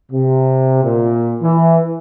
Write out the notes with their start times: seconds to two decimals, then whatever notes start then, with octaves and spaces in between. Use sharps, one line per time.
0.12 C3
0.84 A#2
1.43 E3